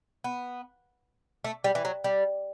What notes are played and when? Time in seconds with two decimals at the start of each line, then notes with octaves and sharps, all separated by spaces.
0.24 B3
1.44 A3
1.64 G3
1.75 E3
1.85 F#3
2.04 G3